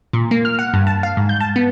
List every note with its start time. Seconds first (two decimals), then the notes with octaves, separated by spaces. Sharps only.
0.13 A#2
0.31 A#3
0.45 F6
0.59 F#5
0.74 G2
0.87 A5
1.03 F5
1.17 G#2
1.29 G6
1.40 A5
1.56 B3